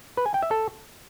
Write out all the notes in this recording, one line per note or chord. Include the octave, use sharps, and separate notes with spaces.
B4
G#5
G5
E5
A4